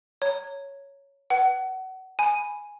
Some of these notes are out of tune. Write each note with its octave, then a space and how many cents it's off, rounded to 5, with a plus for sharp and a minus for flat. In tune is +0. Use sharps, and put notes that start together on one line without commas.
C#5 +0 A#5 -25
B4 +0 F#5 +30
G#5 +0 B5 +0